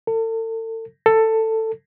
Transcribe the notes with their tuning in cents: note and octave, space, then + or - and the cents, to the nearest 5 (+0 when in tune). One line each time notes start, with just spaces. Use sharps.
A4 +40
A4 +15